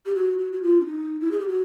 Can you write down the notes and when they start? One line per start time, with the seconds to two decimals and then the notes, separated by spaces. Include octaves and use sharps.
0.06 G4
0.15 F#4
0.39 F#4
0.53 F#4
0.62 F4
0.80 D4
0.85 D#4
1.21 E4
1.31 G#4
1.40 G4
1.48 F#4